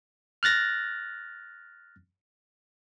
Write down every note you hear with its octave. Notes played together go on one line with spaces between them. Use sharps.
F6 F#6 A6 A#6